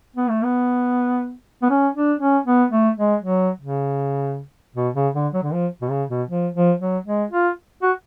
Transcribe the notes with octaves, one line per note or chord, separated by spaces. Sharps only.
B3
A3
B3
B3
C#4
D4
C#4
B3
A3
G#3
F#3
C#3
B2
C#3
D3
F#3
D3
F3
B2
C#3
B2
F3
F3
F#3
G#3
F4
F#4